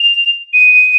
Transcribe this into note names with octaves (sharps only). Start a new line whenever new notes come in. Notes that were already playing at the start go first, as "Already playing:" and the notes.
Already playing: F7
D#7